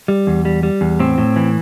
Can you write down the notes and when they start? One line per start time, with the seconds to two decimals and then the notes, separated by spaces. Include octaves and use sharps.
0.08 G3
0.27 E2
0.45 G3
0.63 G3
0.81 E2
1.00 A2 C4
1.18 A2
1.36 E3